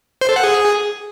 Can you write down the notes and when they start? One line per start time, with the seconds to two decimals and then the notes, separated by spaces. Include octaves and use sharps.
0.21 C5
0.29 A4
0.36 F#5
0.44 G#4